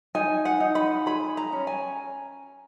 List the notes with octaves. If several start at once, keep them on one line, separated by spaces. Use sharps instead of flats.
D#4 G#5
F#5
D#4
B5
G#4 B5
A#5
C#4
G#5